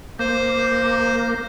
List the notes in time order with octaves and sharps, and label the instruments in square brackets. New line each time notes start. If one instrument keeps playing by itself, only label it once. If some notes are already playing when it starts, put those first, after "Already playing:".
[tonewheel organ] A#3 [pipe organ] C5